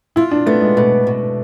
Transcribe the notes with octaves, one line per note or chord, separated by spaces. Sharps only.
E4 F4
D4
A3 B3
G#3
B2 A3
B2